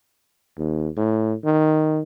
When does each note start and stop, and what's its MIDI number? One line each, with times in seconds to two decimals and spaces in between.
0.58 0.89 39
0.97 1.34 45
1.45 2.02 51